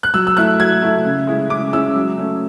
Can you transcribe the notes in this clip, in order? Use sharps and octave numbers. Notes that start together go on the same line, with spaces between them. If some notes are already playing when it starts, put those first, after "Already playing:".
F#6
F#3 E6
E6
A3 E4 F#6
F#3 G#6
A3 E4
C#3
G#3 C#4 E4
C#3 D6
G#3 C#4 E4 E6
F#3
A3 C#4